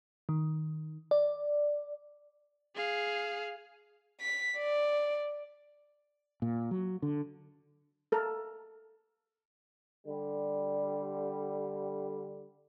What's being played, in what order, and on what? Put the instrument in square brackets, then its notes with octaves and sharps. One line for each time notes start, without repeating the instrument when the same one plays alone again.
[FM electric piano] D#3
D5
[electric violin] G#4 F5
[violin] B6
D5
[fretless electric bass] A#2
F#3
D3
[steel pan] A4 A#4
[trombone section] D3 G3